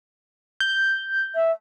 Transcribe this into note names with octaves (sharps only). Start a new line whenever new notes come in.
G6
E5